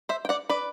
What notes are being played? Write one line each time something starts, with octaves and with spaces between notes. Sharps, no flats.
C5 E5
G5
D5 F#5
B4 D5